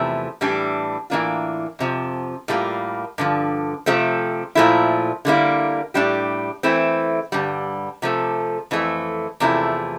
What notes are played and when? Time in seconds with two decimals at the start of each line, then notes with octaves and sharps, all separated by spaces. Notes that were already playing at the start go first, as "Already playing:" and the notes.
Already playing: E2 C3 F3 A3 E4
0.41 A2 E3 G3 D4
1.10 A2 E3 A#3 D4 F4
1.79 F2 C3 F3
2.48 A2 G3 A#3 F4
3.18 G2 D3 F3
3.86 C3 F3 A3 C4
4.55 A#2 F3 A3 E4
5.25 D3 G3 A#3 E4
5.94 A2 G3 D4 G4
6.63 E3 A3 C4 E4
7.32 G2 D3 G3
8.02 C3 F3 A3
8.71 F2 E3 A3
9.40 E2 C3 F3 A3 E4